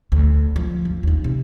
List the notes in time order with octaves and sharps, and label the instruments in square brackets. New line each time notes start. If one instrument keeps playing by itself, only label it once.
[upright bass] D2
F3
G1
D#2 D#4
C3